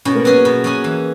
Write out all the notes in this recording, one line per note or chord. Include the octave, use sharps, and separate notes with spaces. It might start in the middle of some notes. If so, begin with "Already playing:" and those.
B2 C#4
A#3
F#3 B3 C#4 G#4
B2
F#3 C#4 G#4
E3